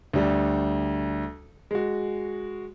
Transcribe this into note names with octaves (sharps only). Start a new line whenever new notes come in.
D2 G3
G#3 F#4